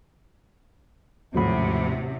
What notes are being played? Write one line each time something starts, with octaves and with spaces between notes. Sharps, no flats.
A1 D#2 G#2 C3 F3 F#3 A3 B5